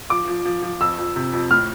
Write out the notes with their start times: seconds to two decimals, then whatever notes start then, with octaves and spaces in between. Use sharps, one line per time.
0.10 F3 D6
0.28 F3
0.46 F3
0.62 F3
0.81 F2 E6
0.98 F2
1.16 C3
1.33 F2
1.51 A2 F6